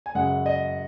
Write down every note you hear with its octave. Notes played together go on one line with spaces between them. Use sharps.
G#5
F#2 C#3 G#3 F#5
D#5